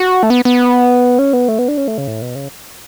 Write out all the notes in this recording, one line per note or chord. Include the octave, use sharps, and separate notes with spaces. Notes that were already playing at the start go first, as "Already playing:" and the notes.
Already playing: F#4
A3
B3
B3
C#4
B3
A3
B3
D4
C#4
A3
C#3
A2
B2
C#3